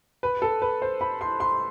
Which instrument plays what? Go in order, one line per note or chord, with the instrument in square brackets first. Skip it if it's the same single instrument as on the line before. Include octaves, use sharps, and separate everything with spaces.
[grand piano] B4
A4
B4
C5
B5
C6
C6